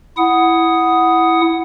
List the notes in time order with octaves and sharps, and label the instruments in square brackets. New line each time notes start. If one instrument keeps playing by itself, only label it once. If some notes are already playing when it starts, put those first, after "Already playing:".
[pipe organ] E4 F#5 D#6